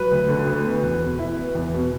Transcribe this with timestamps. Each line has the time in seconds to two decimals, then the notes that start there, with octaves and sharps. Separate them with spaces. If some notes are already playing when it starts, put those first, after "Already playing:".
Already playing: F#3 B4
0.11 D2
0.29 D3
0.47 D2
0.65 B3
0.83 E2
1.01 B2
1.19 E4
1.37 B3
1.55 E2
1.74 B2